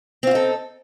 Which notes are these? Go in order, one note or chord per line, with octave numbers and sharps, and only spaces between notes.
C4 D#4 F4 A4